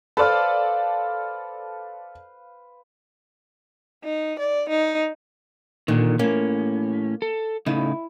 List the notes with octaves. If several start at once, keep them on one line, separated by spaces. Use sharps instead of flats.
A4 B4 C5 D5 F5
D#4
D5
D#4
A#2 D3 D#3
A2 A#3 C#4
A4
A2 C#3 D#4 E4